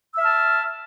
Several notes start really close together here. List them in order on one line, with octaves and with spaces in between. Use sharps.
E6 E5 F6 A5